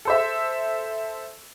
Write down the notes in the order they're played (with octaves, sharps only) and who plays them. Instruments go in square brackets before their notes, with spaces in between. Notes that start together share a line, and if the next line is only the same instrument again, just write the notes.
[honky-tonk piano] A4 C5 E5